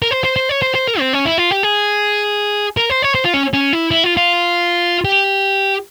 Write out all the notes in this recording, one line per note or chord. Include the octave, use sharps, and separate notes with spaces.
A#4
C5
C5
C5
C#5
C5
C5
A#4
C4
C#4
E4
F4
G4
G#4
A#4
C5
C#5
C5
F4
C#4
C#4
E4
E4
F4
F4
G4